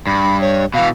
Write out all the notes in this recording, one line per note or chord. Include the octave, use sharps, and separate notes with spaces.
G2 B5
C#5
B2 E3 F5